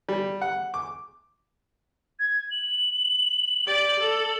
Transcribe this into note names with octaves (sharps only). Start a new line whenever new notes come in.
G3
F#5
D6
G#6
F#7
G4 D5
A4